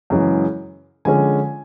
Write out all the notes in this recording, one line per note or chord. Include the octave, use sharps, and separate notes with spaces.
F#2 C#3 E3 G#3
D3 F3 G#3 C#4 G#5